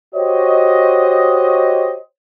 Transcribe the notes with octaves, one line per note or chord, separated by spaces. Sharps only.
F#4 G4 C5 C#5 D#5